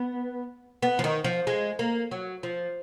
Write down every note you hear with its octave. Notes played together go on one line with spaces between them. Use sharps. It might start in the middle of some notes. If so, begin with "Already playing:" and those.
Already playing: B3
B3
F3
D#3
F3
G#3
A#3
F#3
F3